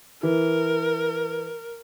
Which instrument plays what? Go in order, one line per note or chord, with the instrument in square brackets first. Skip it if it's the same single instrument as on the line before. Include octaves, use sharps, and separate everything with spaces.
[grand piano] E3 [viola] A#4